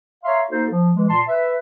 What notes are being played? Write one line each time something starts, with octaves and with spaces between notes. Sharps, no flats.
C#5 E5 F5 A#5 C6
A#3 D#4 F#4 A4 C5
F3
E3 G#3
A#2 A5 C6
B4 E5